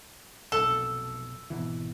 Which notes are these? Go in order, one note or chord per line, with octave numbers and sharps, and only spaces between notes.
F1 B1 A4
G#1 B2 E3